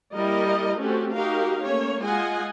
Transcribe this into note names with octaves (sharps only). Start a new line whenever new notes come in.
G3 A#3 E4 A#4 D#5
A3 C4 C#4 F#4 G4 A4
D#4 F#4 G4 A#4 F5
A3 A#3 C#4 C#5
G#3 F4 D#5 F#5 G#5